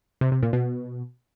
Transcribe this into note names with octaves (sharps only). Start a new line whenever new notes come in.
C3
C3
A#2
B2